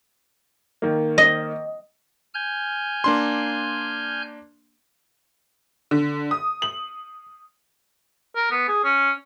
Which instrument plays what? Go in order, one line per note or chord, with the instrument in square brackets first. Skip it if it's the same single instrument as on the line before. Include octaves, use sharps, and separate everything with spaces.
[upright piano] D#3 A#3
[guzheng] D#5
[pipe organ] G#5 F6 G6
[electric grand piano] A#3 D4 C6
[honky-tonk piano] D3
D#6
F#7
[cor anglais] A#4
B3
G#4
C#4